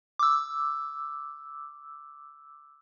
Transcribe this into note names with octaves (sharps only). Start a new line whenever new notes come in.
D6 E6